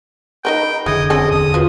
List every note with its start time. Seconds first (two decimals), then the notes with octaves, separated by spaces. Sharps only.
0.45 D#4 A#4 B4 F#5 G5 B5
0.86 F1 D3 E3 G#4 D#5 G#6
1.10 C4 C#4 A4 D#5
1.31 E2 D3 D#6
1.54 F3 F4 F#4 B4